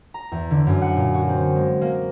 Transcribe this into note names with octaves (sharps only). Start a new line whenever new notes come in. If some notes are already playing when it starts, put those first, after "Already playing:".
A#5
E2
D3
F#2
F#5
A#2
F#4
C4
G#3
A#3